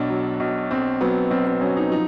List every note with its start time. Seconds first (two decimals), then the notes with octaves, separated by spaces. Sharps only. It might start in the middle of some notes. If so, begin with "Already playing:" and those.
Already playing: B1 B2 D4
0.10 F#3
0.40 B1
0.71 B1 C4
1.01 F#3 B3
1.30 B1 C4
1.47 C4
1.61 F#3 C#4
1.77 D#4
1.91 F3 D#4